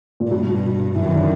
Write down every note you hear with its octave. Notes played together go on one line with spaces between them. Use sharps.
A#2
G2 B2
F#2 E3
D#3
D3